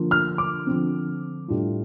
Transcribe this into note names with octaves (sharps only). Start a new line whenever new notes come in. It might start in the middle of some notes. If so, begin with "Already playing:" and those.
Already playing: D3 F3 A#3 F4
F6
D6
D3 F3 C4
A2 G3 D4 F4